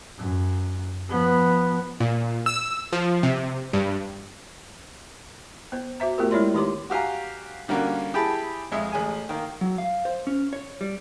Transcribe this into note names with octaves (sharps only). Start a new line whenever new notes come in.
F#2
F3 B3
A#2
E6
F3
C3
G2
B3 C5
F#4 C5 E5 A#5
A3 B3 F4 G4 A#4
G#3 E4 C#5 D5 C6
D#3 D#4 G4 C#5 C6 D6
F#4 G4 F5 G#5 A#5
D3 G3 A#3 C#4 F#4
E4 G4 G#4 G5 A5 B5
F2 G#3 E5
A1 G#4 G#5
D#3 A#3
F#3
F5
C5
C#4
C#5
G3